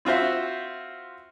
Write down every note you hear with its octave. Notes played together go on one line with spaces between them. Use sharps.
C4 F4 F#4 C5 E5